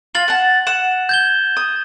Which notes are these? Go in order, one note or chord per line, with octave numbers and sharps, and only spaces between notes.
F4 A6 F#7
F#5 A5
F#5 E7
G6 G#6 G7
D#6